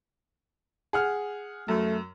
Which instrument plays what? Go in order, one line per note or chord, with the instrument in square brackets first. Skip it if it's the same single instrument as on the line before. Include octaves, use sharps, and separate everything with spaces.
[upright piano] G#4 F#5 F6
[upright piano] F#2 [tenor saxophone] A3